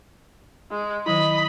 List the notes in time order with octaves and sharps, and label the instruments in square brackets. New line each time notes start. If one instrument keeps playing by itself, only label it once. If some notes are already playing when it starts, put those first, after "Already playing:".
[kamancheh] G#3
[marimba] D#3 F#3 E4 [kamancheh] D#5 B5